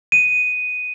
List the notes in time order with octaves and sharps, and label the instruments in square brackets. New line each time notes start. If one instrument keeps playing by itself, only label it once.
[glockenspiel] D#7